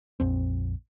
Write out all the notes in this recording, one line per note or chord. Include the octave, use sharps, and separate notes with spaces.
A#1 F2 C4